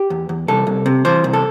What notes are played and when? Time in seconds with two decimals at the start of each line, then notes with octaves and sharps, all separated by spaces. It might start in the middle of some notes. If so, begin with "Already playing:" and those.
Already playing: G4
0.10 E2
0.29 E2
0.48 C2 A4
0.67 C2
0.86 C3
1.05 E3 C5
1.24 C2
1.33 A4